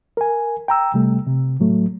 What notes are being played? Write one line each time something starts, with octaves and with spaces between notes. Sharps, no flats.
A#4 G#5
G5 A#5 E6
C3 G3 A3
C3
A2 F#3 A3